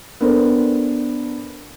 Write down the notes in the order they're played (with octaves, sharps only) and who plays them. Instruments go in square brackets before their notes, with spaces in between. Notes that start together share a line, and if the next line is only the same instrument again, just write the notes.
[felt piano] B3 D4 A4 A#4 C5